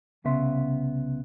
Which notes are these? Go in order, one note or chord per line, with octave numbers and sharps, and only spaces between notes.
C2 C#3 B3 E5 C6